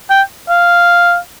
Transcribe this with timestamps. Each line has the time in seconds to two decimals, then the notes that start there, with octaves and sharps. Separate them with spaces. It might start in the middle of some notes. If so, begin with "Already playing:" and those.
0.10 G5
0.49 F5